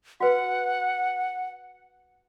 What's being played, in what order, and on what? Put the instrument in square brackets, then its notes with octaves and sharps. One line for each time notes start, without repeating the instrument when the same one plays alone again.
[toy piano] F#4 B4 [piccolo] F#5